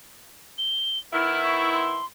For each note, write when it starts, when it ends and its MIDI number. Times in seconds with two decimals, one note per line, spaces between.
0.58 0.99 103
1.13 2.00 51
1.13 2.00 59
1.13 2.00 64
1.13 1.41 89
1.44 1.70 85
1.73 2.05 84